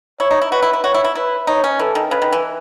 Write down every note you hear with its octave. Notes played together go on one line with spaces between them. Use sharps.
E4 C#5
D#4
E4
F#4 B4
E4
E4
F#4 C#5
E4
E4
E4 B4
D#4 C#5
C#4
E3 A4
D#3
C#3 B4
D#3
E3